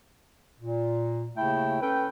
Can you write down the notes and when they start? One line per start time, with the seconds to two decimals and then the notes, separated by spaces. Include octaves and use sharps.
0.59 A#2
1.37 D#2 C#3 A3 E4 G5
1.81 C#4 A4 B4 G5